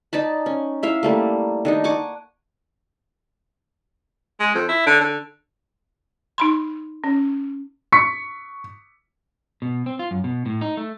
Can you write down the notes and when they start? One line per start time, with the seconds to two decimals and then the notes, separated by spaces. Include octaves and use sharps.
0.13 D#4 D5 A5 B5
0.46 C#4
0.83 E4 E5 F5
1.03 G3 A3 A#3
1.65 D#3 D4 D#4
1.84 F#5 G#5 C#6 D6
4.40 G#3
4.54 F2
4.69 E4
4.86 D3
5.00 D3
6.38 D#4 B5 C6
7.04 C#4
7.92 C#6 B6 C#7
9.62 B2
9.86 C4
9.99 F4
10.11 F#2
10.24 B2
10.46 A2
10.61 D#4
10.77 A3